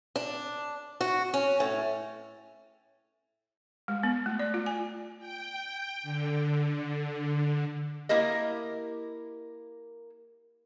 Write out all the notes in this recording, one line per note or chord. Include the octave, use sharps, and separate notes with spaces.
D4
F#4
C#4
A2
G#3
B3
A3
D5
F4
G#5
G5
D3
A#3 E4 G4 A#4 D#5